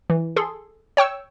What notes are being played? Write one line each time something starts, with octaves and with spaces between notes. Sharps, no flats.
E3
G#4 A4 C6
C#5 G5 C#6 E6